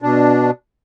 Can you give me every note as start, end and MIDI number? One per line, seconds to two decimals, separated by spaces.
0.02 0.51 47
0.02 0.51 62